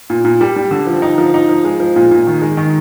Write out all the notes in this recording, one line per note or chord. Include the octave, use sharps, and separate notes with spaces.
A#2
A#2
G3
G3
D3
F3
D#4
F3
D#4
F3
G#3
F3
A#2
A#2
D#3
G#3
D#3